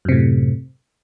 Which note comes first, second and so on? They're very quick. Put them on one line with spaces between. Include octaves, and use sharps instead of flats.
F#2 C3 A2